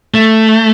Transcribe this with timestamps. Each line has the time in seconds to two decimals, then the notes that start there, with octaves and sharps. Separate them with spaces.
0.14 A3